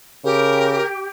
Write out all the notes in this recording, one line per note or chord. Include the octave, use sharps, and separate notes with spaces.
C#3 G4 A#4